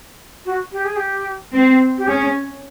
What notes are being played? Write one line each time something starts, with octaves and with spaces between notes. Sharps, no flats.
F#4
G4
G#4
G4
C4
G4
C#4 G#4